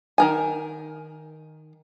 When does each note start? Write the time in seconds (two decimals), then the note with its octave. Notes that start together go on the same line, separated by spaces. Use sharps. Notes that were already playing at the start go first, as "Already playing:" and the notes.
0.18 D#3 A#4 G#5